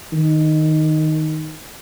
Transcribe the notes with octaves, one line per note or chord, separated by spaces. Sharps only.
D#3